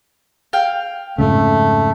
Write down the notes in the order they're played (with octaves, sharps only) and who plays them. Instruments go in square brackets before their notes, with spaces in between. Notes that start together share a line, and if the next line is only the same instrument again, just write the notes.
[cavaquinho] F5 G5
[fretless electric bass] F2 G#2 C#3 [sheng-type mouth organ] A3